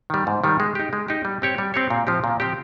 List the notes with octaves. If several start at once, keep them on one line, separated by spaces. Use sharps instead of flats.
D#3 G3
G#2
D#3 G3
G#3
D#4 G4
G#3
D#4 G4
G3
C4 G4 C#5
G3
C4 G4 C#5
A#2
F3 C4 G4
A#2
F3 C4 G4